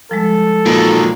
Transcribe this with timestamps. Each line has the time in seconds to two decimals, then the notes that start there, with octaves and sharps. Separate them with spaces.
0.11 F3 G3 G#3 A4
0.66 A#2 D#3 F#3